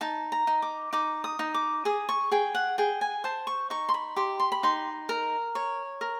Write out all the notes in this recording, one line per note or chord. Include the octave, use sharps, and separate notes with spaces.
D#4 A5
A#5
D#4
D6
D#4 D6
D#6
D#4
D6
G#4 D#6
C#6
G#4 G5
F#5
G#4 G5
G#5
C5 A5
C#6
D#4 C#6
C6
B5
G4 C6
C6
B5
D#4 C6
A#4
C#5
A#4